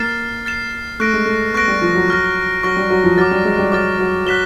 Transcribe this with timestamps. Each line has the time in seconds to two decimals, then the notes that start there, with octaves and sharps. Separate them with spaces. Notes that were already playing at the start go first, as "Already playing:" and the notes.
Already playing: A#3 F6 A6 C7 E7
0.45 F6 A6 C7 E7
1.00 A3 C#6 F#6 A#6 D7
1.13 G#3
1.26 A3
1.54 B3 C#6 F#6 A#6 D7
1.68 G3
1.82 F3
1.95 F#3
2.08 C#6 F6 A#6
2.63 F#3 C#6 F6 A#6
2.76 G3
2.90 F#3
3.04 F3
3.17 F#3 D6 F6 A6
3.31 G3
3.45 G#3
3.59 G3
3.72 F#3 D6 F6 A6
3.99 F#3
4.26 F#3 F#6 B6 E7 G7